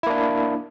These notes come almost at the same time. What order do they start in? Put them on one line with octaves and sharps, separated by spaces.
E4 A#3 D4